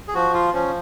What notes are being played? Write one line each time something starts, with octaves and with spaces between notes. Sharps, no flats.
G#4
F3 F#4
F4
F3 C#4